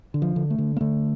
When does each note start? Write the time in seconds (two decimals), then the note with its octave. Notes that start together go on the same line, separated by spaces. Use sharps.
0.14 D3
0.22 F3
0.36 D3
0.50 A3
0.58 D3
0.76 A#3
0.81 D3 A3